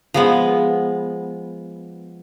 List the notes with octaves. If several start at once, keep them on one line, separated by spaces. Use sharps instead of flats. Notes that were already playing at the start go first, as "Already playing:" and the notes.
F3 G#3 B3